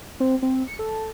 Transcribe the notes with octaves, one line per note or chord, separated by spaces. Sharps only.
C4
C4
C#7
A4